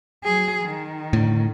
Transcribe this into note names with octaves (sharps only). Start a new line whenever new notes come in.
F#3 G#4
D#3
A2 D3